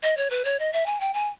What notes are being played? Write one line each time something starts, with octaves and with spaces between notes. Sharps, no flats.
D#5
C#5
B4
C#5
D#5
E5
G#5
G5
G#5